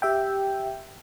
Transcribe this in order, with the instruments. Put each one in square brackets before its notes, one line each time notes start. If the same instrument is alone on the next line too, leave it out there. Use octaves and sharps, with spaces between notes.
[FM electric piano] G4 E5 G5